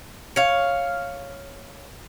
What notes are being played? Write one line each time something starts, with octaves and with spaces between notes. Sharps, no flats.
C#5 F5